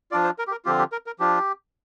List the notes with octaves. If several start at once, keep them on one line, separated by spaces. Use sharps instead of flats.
F3 D4 F4 D5
C5
A#4
G4
A#4
D3 F3 C4 F4 G4
G4
A#4
A#4
F3 D4 F4 G4